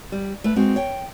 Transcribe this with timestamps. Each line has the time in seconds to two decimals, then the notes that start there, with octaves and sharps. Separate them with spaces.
0.12 G3
0.44 A3 B4
0.56 G#3 C4 F#4
0.76 C#5 G5